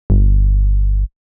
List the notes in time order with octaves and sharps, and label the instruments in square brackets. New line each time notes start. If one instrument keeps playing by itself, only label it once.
[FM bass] G1